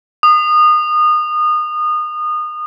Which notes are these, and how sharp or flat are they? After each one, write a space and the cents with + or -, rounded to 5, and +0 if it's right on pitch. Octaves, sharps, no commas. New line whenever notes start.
D#6 -25